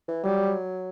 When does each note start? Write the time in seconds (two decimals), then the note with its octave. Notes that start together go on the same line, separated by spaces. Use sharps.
0.08 E3
0.24 F#3 G3